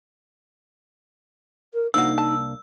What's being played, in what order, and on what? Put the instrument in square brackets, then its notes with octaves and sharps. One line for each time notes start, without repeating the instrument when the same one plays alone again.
[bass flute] A#4
[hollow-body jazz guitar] C2 A#3 D4 [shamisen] F3 F#4 [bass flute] D#4 [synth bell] E6
[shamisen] A5